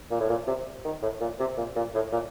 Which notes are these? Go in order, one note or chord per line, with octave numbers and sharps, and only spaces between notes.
A#2
A2
A#2
C3
D#3
A2
A#2
C3
A#2
A#2
A2
A#2